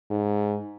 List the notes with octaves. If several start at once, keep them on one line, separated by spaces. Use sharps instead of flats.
G#2